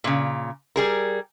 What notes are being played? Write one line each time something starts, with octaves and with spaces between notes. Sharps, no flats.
A#2 C#3
G3 G#4 A#4